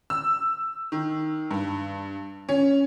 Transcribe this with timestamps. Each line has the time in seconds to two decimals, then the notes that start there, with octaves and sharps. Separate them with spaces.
0.10 E6
0.92 D#3
1.51 G2
2.49 C#4